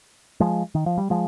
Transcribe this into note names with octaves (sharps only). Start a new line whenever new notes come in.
F3 G#3
D#3
F3
G3
F3 G#3